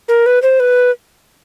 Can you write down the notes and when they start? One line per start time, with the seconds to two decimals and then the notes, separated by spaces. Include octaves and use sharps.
0.08 A#4
0.26 B4
0.42 C5
0.60 B4